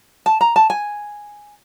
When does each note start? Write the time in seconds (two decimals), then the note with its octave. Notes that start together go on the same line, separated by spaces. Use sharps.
0.26 A5
0.41 A#5
0.56 A5
0.70 G#5